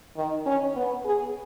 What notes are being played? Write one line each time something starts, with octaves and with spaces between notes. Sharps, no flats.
D#3
C#4
B3
G#4